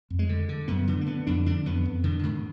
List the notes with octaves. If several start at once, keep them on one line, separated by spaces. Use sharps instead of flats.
F2
G#3
D3
D3
F#2 B3
D3
A#3
D3 B3
F2 D4
D3 D4
F2 B3
F2
D3 D#3
G#2